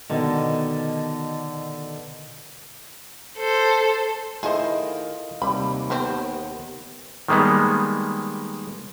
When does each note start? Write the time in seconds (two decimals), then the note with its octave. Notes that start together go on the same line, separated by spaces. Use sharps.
0.10 B2 D3 D#3
3.38 A4 C5
4.43 D#3 A3 E4 F4 G#4 C5 D#5 F5
5.42 D#2 C3 G3 B5
5.90 B3 C4 G4 B4 C5
7.28 D#3 G3 G#3 A#3 B3